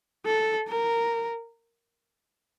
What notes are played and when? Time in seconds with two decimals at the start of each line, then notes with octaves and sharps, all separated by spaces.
0.26 A4
0.68 A#4